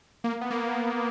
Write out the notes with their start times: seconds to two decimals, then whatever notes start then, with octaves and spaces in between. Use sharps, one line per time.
0.24 A#3
0.41 B3
0.50 A#3